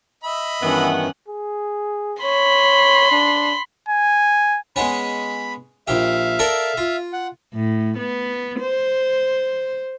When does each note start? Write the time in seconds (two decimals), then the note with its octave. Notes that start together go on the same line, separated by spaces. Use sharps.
0.24 D#5 E5 B5
0.62 G2 D#3 E3 B3 C#4 F#5
1.28 G#4
2.23 C#5 B5 C6
3.12 D4
3.88 G#5
4.76 G#3 B3 C#4 B5
5.88 A#1 G4 E5 F5
6.39 A4 A#4 D5
6.78 F4
7.13 F#5
7.54 A2
7.98 B3
8.60 C5